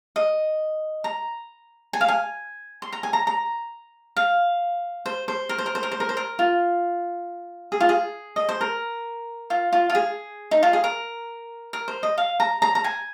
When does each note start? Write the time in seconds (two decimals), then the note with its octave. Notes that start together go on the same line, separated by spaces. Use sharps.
0.16 D#5
1.04 A#5
1.93 G#5
2.01 F5
2.08 G#5
2.82 C6
2.92 A#5
3.03 G#5
3.13 A#5
3.27 A#5
4.17 F5
5.06 C5
5.28 C5
5.49 A#4
5.58 C5
5.66 A#4
5.75 C5
5.83 A#4
5.92 C5
6.00 A#4
6.09 C5
6.17 A#4
6.39 F4
7.72 G#4
7.80 F4
7.89 G#4
8.36 D#5
8.49 C5
8.61 A#4
9.50 F4
9.73 F4
9.90 F4
9.95 G#4
10.51 D#4
10.63 F4
10.73 G#4
10.84 A#4
11.73 A#4
11.88 C5
12.03 D#5
12.18 F5
12.40 A#5
12.62 A#5
12.75 A#5
12.84 G#5